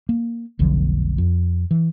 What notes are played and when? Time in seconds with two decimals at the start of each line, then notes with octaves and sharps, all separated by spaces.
0.09 A#3
0.59 F1 B1 D3 F3
1.18 F2
1.71 E3